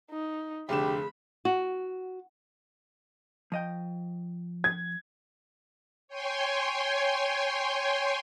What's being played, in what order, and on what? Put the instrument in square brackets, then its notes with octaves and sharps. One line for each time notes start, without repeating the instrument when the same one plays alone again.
[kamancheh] D#4
[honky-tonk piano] F1 D3 E7 [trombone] G4 [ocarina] G#4 [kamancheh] B5
[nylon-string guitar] F#4
[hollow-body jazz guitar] F3 D#5 G5
[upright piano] G#6
[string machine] C#5 G5 G#5 C6